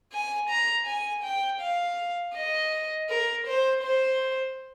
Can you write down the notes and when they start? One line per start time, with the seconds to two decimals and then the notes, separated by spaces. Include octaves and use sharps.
0.13 G#5
0.49 A#5
0.86 G#5
1.24 G5
1.61 F5
2.35 D#5
3.09 A#4
3.47 C5
3.83 C5